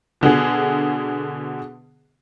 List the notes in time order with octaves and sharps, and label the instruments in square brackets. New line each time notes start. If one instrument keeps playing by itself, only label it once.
[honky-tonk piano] B2 D3 F#4 G#4